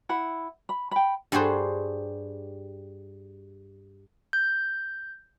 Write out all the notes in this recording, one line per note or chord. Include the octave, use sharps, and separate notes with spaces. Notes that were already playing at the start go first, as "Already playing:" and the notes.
E4 F#5 B5
B5
G5 B5
G2 G3 F#4 G#4 C5
G6